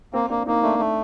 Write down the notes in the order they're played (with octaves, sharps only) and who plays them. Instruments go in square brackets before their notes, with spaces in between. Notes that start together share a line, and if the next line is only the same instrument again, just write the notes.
[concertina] A#3 [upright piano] C4
[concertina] A#3 [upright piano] D4
[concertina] A#3 [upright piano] D#4
[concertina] A3 [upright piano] D4
[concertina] A3